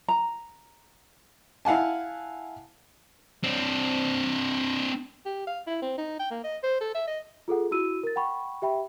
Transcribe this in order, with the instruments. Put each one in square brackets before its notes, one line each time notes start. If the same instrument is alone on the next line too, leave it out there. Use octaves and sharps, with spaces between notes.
[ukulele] A#5
[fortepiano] E4 F5 F#5 G#5 A5
[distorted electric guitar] C4 D4
[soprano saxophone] G4
F5
E4
C4
D#4
G5
A#3
D#5
C5
A4
E5
D#5
[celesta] F4 G#4 A4 F#5
E4 F#4 E6 D#7
A#4 A6
F#5 G5 B5 C#6
G4 E5 G5 B5